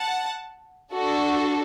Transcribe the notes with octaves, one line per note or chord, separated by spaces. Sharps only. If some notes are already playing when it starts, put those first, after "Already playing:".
Already playing: F#5 A5
D4 F#4 A4